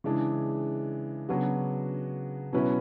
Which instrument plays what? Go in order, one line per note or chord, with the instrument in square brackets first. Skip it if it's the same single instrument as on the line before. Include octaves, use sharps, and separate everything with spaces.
[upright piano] C#3 E3 G#3 D4 G#4
C#3 F#3 B3 D4 F#4
B2 F#3 C#4 E4 B4